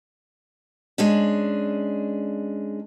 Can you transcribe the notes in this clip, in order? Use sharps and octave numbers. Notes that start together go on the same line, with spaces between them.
G#3 C#4 D4